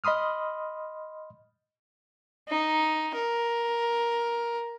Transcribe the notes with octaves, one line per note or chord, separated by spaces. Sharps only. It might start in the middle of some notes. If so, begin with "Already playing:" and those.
D#5 B5 C6 D#6 F6
D#4
A#4